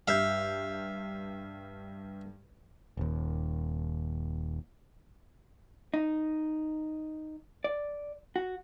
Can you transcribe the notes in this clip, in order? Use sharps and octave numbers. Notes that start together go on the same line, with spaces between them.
G2 E5 F5 G6
D#1 D#2
D#4
D5
F#4